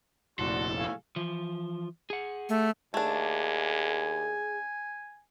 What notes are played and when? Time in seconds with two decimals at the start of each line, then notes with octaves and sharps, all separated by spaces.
0.39 F1 A#1 A2 D4 F#4 A4 C6
0.79 A3 F5 G#5
1.16 E3 F3
2.10 G#4 F#5
2.49 A3
2.94 D#2 A3 D4 G#4 G#5